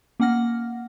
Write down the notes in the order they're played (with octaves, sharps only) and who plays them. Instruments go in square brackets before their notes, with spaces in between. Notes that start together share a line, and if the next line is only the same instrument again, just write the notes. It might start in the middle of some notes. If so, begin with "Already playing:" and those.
[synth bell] A#3 C#4 F#5 F6 A#6